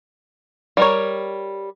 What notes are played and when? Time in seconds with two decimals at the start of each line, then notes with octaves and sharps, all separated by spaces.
0.77 G3 A#4 C#5